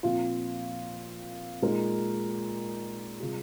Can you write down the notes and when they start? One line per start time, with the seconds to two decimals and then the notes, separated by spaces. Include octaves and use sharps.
0.03 A#2 F3 C4 F4
1.62 A#2 G#3 D#4 A#4
3.20 C3 G3 C4 F4 G#4